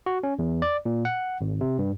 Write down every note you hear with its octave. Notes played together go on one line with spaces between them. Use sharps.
F#4
C#4
E2
D5
A#2
F#5
G#1
C3
G2